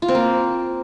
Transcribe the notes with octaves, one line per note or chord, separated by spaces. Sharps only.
F4
C4
A#3